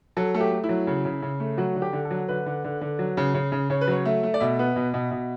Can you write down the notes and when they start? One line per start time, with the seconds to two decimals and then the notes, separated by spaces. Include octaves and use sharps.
0.17 F#3 A4
0.34 A3 A4
0.40 G4
0.51 A3
0.64 E4
0.69 F#3
0.87 C#3
1.05 C#3
1.22 C#3
1.40 A3
1.57 F#3 F#4
1.75 D3
1.82 G4
1.93 D3
2.05 A4
2.11 F#3
2.28 D3 B4
2.46 D3
2.64 D3
2.81 D3
2.99 F#3
3.17 C#3
3.34 C#3
3.52 C#3
3.70 C#3 C#5
3.81 B4
3.87 F#3 C#5
4.05 A3 E5
4.23 A3
4.34 D5
4.40 B2 E5
4.59 B3
4.76 B2
4.94 B2
5.11 B2